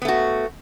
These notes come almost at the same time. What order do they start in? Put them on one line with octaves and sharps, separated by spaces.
B3 A3 F#4